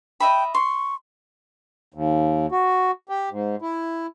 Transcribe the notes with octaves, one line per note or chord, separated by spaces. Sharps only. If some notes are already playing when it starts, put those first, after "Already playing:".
D#5 E5 G5 B5
C6 C#6
D#2
F#4
G4
G#2
E4